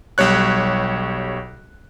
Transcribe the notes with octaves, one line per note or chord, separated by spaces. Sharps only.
B1 G3 C#5 F#6